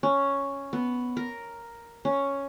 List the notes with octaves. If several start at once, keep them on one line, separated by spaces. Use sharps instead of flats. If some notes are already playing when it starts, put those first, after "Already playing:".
C#4
B3
A#4
C#4